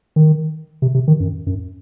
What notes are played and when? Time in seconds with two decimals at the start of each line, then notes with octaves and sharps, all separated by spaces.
0.16 D#3
0.82 C3
0.95 C3
1.08 D#3
1.20 F#2
1.47 F#2